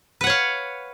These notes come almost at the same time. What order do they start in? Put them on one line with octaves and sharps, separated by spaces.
B4 F#5 C#5 F5